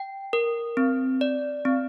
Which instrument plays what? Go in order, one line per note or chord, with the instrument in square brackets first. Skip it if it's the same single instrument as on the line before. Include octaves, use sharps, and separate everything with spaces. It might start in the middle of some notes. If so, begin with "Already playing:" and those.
Already playing: [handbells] G5
A#4
C4
D5
C4